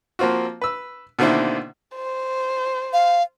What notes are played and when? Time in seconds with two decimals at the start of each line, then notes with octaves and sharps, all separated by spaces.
0.19 F3 A#3 C4 F4 F#4
0.62 B4 E6
1.19 B2 D3 D#3 A#3 C4 E4
1.96 C5
2.93 F5